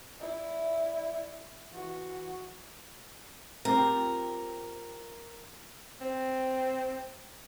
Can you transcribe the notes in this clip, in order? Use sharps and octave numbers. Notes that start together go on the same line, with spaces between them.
E4 D5 E5
E3 F#4
C4 F4 G4 A#4
C4